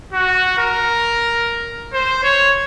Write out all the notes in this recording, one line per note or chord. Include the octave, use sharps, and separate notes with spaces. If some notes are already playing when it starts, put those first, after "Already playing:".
F#4
A#4
C5
C#5